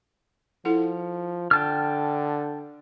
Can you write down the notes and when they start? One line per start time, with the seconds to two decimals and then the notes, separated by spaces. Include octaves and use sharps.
0.65 F3 E4 A4 F#5
1.51 D3 G5 A5 F6